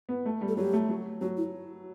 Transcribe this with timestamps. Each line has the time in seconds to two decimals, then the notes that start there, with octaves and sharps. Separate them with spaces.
0.09 B3
0.26 A3
0.41 G3
0.48 A4
0.57 F#3 G4
0.73 A3
0.89 F#3
1.21 F#3 F#4
1.37 E4